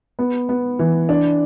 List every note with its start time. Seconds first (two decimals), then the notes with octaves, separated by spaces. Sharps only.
0.19 B3
0.49 B3
0.79 E3
1.09 D4